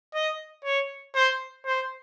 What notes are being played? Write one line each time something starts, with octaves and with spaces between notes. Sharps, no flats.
D#5
C#5
C5
C5